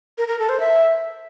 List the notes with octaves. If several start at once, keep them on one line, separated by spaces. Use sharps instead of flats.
A#4
A#4
A4
C5
E5